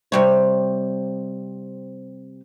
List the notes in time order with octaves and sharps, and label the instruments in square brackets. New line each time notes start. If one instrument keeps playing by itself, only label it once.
[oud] C3 G3 C#5